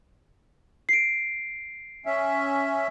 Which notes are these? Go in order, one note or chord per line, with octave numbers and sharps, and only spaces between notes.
C7 D7
C#4 E5